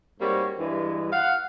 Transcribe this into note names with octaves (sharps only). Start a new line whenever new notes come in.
G#2 G3 A#3 C4 F#4 C#5
G2 E3 G#3
F5 F#5